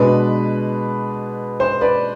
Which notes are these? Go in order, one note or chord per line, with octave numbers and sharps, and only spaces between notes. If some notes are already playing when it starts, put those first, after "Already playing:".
Already playing: B2 G#3 D4 B4
C5
B4 D5